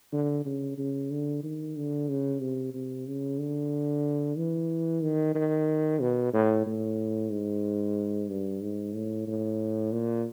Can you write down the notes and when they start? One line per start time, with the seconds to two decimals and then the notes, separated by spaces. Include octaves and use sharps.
0.12 D3
0.45 C#3
0.78 C#3
1.11 D3
1.43 D#3
1.76 D3
2.09 C#3
2.41 C3
2.74 C3
3.07 C#3
3.40 D3
4.37 E3
5.02 D#3
5.35 D#3
6.01 B2
6.33 A2
6.66 A2
7.30 G#2
8.29 G2
8.61 G#2
8.93 A2
9.27 A2
9.92 A#2